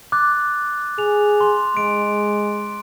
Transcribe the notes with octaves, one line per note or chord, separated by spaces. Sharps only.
D6 F#6 A6
G#4 F7
C6
G#3 D7